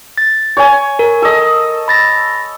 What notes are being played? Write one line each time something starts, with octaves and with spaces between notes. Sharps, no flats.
A6
C#5 G#5
A#4
A4 D#5
B5 A6 A#6